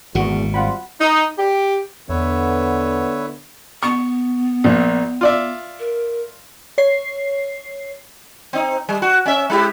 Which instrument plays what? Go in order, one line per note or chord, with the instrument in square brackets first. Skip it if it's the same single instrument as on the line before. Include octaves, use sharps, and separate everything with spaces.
[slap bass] G#1 A#2 [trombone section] E2 [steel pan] F#4
[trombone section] G3 C4 F4 [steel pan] F#5 B5
[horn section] D#4
G4
[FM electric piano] E2 [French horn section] D3 B3 [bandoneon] B4 C#5 E5
[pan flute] B3 [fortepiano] C#6
[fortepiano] A#1 A#2
F4 D5 E5
[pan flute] A#4
[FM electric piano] C#5 C7
[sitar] C4 D#4
G3
F#4
C#4 E5
G#3 E4 G4